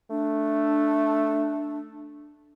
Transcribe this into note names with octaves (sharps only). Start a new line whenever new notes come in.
A3 D4